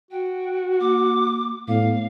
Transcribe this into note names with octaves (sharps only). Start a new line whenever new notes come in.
F#4 G5
A#3 D6
A2 B3 F5